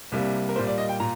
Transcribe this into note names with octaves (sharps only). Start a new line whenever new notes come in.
C2 C3 G3 A#3
A#4
A#2 G3 A#3 C5
D5
D#5
G5
A#2 A#5